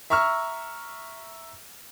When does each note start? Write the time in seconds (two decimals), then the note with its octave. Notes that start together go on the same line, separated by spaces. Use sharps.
0.10 E5 A#5 C#6 E6 F6